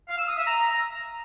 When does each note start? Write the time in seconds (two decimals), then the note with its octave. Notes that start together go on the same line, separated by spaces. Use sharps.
0.09 F5
0.18 E6
0.28 D#6
0.37 E5
0.47 A#5